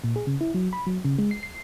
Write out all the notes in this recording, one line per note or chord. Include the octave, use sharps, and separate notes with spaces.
A#2
G#4
C#3
E4
F#3
B5
F#3
C#3
G#3
C7
C7